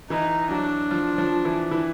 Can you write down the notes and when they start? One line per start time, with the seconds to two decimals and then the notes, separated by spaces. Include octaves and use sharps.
0.10 E3 D#4 E4
0.51 F#3 D4 F#4
0.91 F3 F4
1.18 F3 F4
1.45 E3 E4
1.71 E3 E4